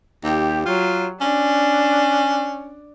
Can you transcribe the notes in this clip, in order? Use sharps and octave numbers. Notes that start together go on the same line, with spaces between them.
D#2 G4
F#3 F4
C#4 D4